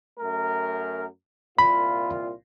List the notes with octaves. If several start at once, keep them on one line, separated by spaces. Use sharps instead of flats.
F#2 A3 A#4
C2 A#2 F4 B5